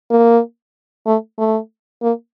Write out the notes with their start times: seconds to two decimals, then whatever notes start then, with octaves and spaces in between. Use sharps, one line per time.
0.10 A#3
1.06 A3
1.38 A3
2.02 A#3